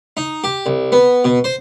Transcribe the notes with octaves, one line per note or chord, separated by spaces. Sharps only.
D#4
G4
C2
B3
B2
C5